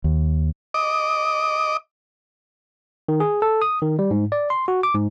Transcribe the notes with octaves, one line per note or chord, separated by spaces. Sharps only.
D#2
D#5 D6
D#3
G#4
A4
D#6
D#3
G3
G#2
D5
C6
F#4
D6
G#2